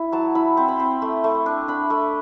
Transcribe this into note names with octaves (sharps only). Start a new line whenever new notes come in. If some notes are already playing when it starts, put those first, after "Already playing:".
Already playing: E4
F#3 A5
E4 B5
C4
B5
C4
A3
A3
D4
D4 B5
A3